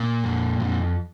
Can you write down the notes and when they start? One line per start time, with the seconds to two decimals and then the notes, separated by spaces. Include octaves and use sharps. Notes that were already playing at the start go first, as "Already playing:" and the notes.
Already playing: A#2
0.24 F2
0.60 F2